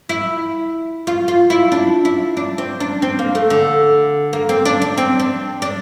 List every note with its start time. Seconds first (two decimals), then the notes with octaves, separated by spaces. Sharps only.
0.09 E4
1.07 F4
1.28 F4
1.50 E4
1.72 D4
2.05 E4
2.37 D4
2.58 C4
2.80 D4
3.02 C4
3.19 A#3
3.35 A3
3.50 D3
4.33 A#3
4.49 C4
4.65 D4
4.82 D4
4.98 C4
5.20 D4
5.62 D4